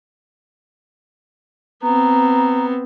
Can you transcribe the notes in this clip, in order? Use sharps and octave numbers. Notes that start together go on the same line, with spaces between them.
B3 C4 A#5